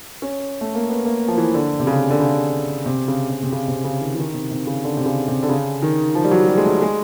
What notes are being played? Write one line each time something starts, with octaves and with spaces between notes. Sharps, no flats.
C#4
A3
A#3
B3
A#3
F3
E3
D3
C3
C#3
D3
C#3
C3
C#3
C3
C3
C#3
C3
C#3
D#3
E3
D#3
C3
C3
C#3
D3
C3
C#3
C3
D3
C#3
D#3
F3
G3
F#3
G3
G#3
A3
G#3